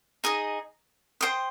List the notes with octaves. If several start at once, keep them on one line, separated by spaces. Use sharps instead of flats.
D#4 G#4 D#5
C5 G5 C6 D#6